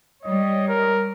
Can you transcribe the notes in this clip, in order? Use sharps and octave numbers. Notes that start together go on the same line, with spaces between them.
G3 C#5 D#5
A#4